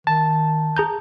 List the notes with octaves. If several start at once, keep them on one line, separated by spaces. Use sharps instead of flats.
D#3 A5
G#4 A#5 G6